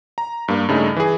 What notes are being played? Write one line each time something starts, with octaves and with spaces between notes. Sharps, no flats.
A#5
G2 A#3
G2 C#3 A3 D#4
E3 G#4